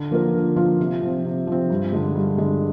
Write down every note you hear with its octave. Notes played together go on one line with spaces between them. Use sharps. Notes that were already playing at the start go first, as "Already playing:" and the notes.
Already playing: D3
F3 A#3 F4 A#4
D3
F3 A#3 F4 A#4
C3
F3 C4
C3
F3 C4
G2
D3 G#3
G2
D3 G#3